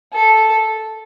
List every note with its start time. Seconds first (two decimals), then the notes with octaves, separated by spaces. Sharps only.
0.13 A4